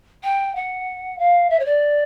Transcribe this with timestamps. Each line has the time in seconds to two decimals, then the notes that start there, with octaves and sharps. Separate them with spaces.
0.24 G5
0.55 F#5
1.19 F5
1.50 E5
1.59 C#5
1.65 D5